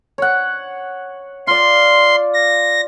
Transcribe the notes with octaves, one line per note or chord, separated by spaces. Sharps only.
C#5 F#5
F4 D5 C6
A#6